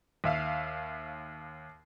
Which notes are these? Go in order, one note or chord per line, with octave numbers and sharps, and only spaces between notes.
D#2 E5 F5